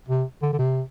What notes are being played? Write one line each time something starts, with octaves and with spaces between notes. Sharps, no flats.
C3
D3
D3
C3